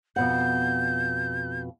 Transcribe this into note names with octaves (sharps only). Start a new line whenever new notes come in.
F2 B2 F#5 G6